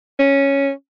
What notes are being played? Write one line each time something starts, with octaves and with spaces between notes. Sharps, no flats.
C#4